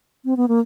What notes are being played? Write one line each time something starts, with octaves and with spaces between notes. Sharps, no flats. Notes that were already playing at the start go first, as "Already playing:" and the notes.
C4
B3
A#3